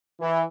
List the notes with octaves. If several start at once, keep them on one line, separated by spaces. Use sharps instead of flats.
E3